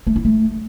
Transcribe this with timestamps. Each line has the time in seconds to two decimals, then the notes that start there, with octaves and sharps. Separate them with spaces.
0.07 A3
0.16 E4
0.25 A3